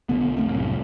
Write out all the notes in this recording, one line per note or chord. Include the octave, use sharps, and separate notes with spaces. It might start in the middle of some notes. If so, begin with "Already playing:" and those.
B1 D3 B3
F1 A#1 A3 C4
C2 F#2 A2